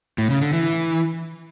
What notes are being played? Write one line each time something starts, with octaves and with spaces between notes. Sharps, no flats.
A2
C#3
D3
E3